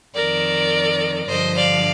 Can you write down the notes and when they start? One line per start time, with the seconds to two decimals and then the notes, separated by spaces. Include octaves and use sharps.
0.15 F2 D#3 A#4 D5
1.28 G2 D3 F3 C5 D#5
1.57 D5 F5